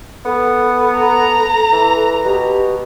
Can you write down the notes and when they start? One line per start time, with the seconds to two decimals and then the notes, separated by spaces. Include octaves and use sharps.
0.25 B3 A4
0.99 A#5
1.72 E3
2.25 B2 G4